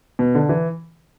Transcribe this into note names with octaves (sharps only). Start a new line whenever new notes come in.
B2
D3
E3